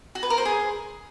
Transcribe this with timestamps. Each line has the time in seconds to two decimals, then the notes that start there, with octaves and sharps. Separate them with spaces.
0.15 F#4
0.23 B4
0.30 A#4
0.38 C5
0.45 G#4